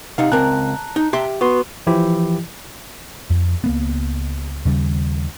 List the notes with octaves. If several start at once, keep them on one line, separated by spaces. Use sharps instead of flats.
C3 D#4 F5 F#5
C#2 C4 A#4 A5 A#5 F#6
D#4
G4 E5 C6
B3 F#4 B4 C6
E3 F3 E4 G4
F2
C#2 A#3 B3
D#2 C#3 G3